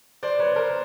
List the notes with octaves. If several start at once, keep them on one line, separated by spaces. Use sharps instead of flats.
C5 D5
B4 C#5
A#4 C5